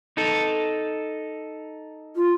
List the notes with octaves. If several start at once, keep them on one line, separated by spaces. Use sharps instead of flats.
D#4 A4
F4